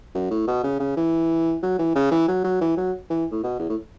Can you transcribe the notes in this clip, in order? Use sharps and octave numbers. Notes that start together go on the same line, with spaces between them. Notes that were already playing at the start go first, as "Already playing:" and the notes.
F#2
A2
B2
C#3
C#3
E3
F#3
E3
C#3
E3
F#3
F#3
E3
F#3
E3
A2
B2
E2
A2